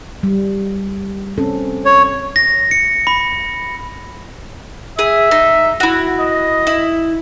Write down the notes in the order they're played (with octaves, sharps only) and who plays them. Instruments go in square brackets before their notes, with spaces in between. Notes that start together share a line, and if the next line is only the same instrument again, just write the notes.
[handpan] G3
C4 C#4 A4
[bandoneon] C#5
[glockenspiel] A#6
C#7
B5
[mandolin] G#4 [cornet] E5
[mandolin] D#4
E4 F#4
[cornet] D#5
[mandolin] E4